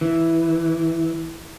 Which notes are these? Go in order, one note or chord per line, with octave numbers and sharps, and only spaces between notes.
E3